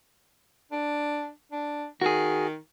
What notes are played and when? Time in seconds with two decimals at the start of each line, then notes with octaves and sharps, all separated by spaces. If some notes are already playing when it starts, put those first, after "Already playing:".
0.71 D4
1.52 D4
2.02 D#3 F#4 G#4